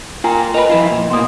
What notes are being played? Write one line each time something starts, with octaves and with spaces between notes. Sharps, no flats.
F4 A#4 G5 G#5 A#5
A#4 B4 D#5 B5
F3 E4 F4
A#2
B2 A#3 C6 D#6